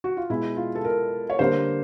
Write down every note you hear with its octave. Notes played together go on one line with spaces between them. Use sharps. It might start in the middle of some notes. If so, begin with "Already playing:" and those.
F#4
F4
B2 G#3 E4
F4
A4
A#4
C#5
D3 G3 A#3 C5